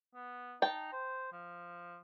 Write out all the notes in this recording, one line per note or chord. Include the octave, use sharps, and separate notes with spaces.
B3
D#4 G5 A5
C5
F3